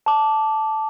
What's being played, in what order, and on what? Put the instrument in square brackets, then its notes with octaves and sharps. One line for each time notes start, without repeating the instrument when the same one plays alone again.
[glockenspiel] A5 D6